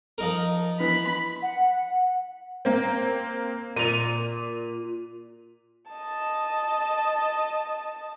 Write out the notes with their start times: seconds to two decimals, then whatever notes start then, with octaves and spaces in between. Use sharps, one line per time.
0.18 F3 D#4 A#4
0.80 E3 B3 B5
1.42 F#5
2.65 A#3 C4
3.76 A#2 D#7 F7
5.91 D#5 A5